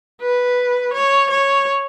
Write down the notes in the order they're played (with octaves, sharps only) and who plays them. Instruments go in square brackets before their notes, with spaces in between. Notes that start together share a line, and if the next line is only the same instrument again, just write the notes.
[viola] B4
C#5
C#5